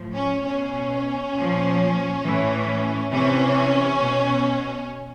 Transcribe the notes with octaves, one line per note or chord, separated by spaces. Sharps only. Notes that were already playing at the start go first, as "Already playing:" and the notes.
Already playing: A2 F3
C#4
B2 C#4
A#2 F3
A2 E3
C3 E3 C#4
B2